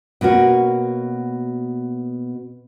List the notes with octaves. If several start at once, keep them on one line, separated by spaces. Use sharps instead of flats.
B2 A#3 C#4 F#4